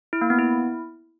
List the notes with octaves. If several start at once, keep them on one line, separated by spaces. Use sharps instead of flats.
E4
A#3
B3
E4